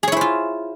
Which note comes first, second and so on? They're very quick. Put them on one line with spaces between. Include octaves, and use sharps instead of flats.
G#4 C#5 E4 C5 F4